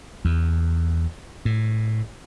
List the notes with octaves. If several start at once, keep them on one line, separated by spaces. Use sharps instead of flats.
E2
A2